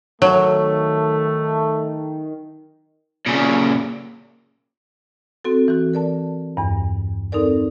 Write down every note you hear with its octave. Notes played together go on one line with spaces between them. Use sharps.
D#3 F#3 A3
A#2 C#3
C4 F#4 A4
E3 F#4
A#4 D5 A5
E2 G2
C4 D#4 A4 A#4 D5